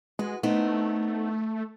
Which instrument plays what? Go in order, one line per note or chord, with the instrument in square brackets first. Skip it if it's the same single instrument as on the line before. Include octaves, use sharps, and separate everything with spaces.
[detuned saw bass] G#3 [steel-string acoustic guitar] F#4 B4
[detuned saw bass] A3 [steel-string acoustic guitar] B3 C4 D#4